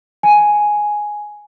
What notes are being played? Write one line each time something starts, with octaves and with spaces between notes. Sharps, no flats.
G#5